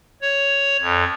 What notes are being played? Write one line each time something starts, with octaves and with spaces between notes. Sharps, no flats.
C#5
F2